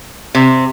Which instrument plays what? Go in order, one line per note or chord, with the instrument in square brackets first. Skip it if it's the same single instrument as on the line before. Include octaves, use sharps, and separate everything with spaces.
[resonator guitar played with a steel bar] C3